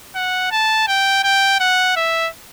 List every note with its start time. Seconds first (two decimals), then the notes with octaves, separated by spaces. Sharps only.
0.15 F#5
0.51 A5
0.88 G5
1.24 G5
1.60 F#5
1.96 E5